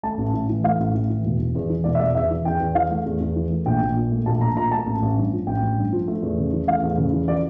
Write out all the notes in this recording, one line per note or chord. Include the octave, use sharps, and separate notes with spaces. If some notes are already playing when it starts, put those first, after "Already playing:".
A3 A5
A1
A2
E3
A3 F5
A1
A2
E3
E1
E1
E2
E3
E1 D5
E5
E1 D5
E2 E5
E3
E2 G5
E2
E3 F5
A3
E2
E2
E3
A3
A#1 G5
A#1
A#2
A3
A#1 A5
A#1 A#5
A#2 A#5
A3 A5
A1
A1
G2
F3
A1 G5
A1
G2
F3
A3
E2
C#3
E3
A3 F5
E2
C#3
E3
F3 D5